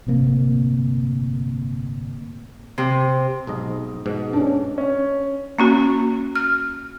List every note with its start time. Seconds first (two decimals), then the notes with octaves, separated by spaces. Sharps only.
0.07 G1 A2 C3 A#3
2.78 C3
3.47 B1 G#2 D#5
4.06 G#2 B2
4.33 C#4 D4
4.78 C#4
5.58 A#3 C#4 F#4
6.35 F6